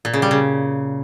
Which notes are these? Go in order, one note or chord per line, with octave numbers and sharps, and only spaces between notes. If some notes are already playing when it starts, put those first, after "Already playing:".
A#2
C#3
G3
C#3